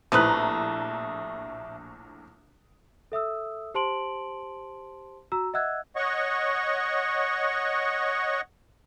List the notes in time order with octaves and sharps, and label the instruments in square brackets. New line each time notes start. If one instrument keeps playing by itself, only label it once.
[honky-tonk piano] A#1 A2 A#5 [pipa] C3 A3 B4 [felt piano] D#6 F#6
[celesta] A4 E5 D#6 E6
G4 C5 A5 C6 D7 F#7
F#4 A#5 E6
D#5 E5 F#5 E6 F#6 G#6
[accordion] C#5 D#5 F#5 C#6